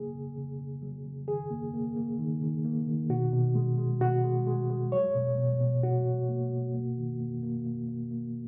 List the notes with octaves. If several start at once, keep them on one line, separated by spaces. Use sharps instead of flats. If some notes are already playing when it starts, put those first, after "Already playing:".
Already playing: C#3 F#3 A#3 G#4
C#3
C#3
C#3
F#3
C#3
D#3 G#4
A#3
A#3
A#3
D#3
D#3
A#3
D#3
B2 F#4
B2
G#3
G#3
B2 F#4
G#3
G#3
G#3
F#3 C#5
B2
B2
B2
B2 F#4
B2
A#3
B2
A#3
D#3
A#3
A#3
A#3
A#3
A#3